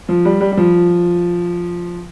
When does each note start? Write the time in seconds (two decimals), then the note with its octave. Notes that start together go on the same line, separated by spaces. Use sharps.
0.09 F3
0.25 G3
0.41 G3
0.52 G3
0.57 F3